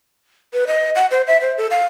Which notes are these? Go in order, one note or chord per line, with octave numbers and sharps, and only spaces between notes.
B4
D#5
F#5
C5
E5
C5
A4
F5